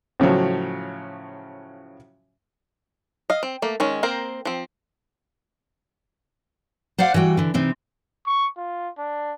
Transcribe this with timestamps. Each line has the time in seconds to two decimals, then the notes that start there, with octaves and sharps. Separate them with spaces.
0.20 A2 C#3 F3 F#3
3.30 D#5 F5
3.43 C4
3.62 A3 A#3
3.80 D#3 G#3 C#4
4.03 A#3 C4 A#4 C5
4.45 F3 C4
6.98 C5 D5 F5 F#5
7.14 E3 G3 F#4 G5
7.37 D3 E3
7.54 C3 E3 C4 D#4
8.27 C#6
8.57 F4
8.98 D4